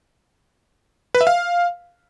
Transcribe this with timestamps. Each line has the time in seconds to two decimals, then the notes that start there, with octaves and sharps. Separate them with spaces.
1.15 B4
1.21 E5
1.27 F5